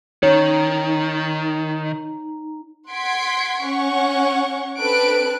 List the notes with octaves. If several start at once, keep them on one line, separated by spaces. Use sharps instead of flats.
D#3 D#4 C#5 A#5
F#5 C6 G#6 B6 C7 D7
C#4 F#5 C#6
C4 D4 A4 B4 F#6 D7